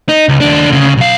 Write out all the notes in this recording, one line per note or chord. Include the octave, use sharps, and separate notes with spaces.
D#4
C#2
D#2 D4
D2 C#3
B1 F5